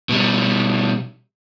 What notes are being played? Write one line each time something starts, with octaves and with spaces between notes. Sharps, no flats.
B2 G3